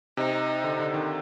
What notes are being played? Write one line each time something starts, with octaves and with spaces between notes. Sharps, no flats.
C3 D#4
D3
D3
D#3